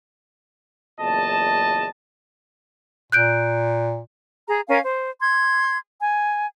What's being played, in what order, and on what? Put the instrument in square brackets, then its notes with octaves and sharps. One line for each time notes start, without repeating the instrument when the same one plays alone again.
[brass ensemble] F#1 E2 A#2 D#5 A5
[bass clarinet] A#2 [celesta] F#6 G6 D7
[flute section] G#4 A#5
C#4 A#4 F5 G#5
C5
C6 G#6
G#5